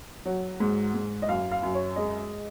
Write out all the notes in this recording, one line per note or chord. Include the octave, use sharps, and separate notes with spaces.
F#3
G#2
G#2
D#5
F#2 F5
F5
F#2
C#5
G#3 D#5